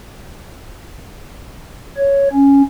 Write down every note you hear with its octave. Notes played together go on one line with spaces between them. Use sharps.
C#5
C#4